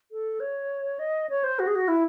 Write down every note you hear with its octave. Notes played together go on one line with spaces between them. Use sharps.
A4
C#5
D#5
C#5
C5
F#4
G#4
F#4
E4